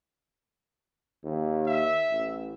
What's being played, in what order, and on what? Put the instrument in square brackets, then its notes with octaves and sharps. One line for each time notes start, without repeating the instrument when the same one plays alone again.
[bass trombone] D#2
[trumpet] E5
[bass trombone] A1